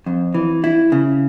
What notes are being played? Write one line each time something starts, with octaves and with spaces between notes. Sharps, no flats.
F2
E3
E4
C#3